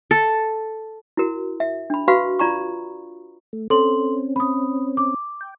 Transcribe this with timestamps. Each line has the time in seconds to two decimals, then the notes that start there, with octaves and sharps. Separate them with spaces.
0.11 A4
1.17 E4 F#4 A#4
1.60 E5
1.90 D4 B5
2.08 F#4 B4 F5 B5 C#6
2.39 F4 D5 A#5 B5 C#6
3.53 A3
3.70 C4 C#4 A4 C6 F#7
4.36 B5 D#6
4.97 D6
5.41 G5